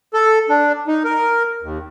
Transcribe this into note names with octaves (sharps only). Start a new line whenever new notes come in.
A4
D4
D#4
A#4
D#2